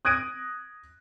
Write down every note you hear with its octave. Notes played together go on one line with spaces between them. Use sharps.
D#6 F#6 G#6 A#6 D7 D#7